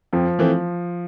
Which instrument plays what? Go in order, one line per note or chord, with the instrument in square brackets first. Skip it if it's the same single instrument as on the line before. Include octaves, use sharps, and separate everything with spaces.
[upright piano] F2 [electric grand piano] F3
[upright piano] E3 A3 C4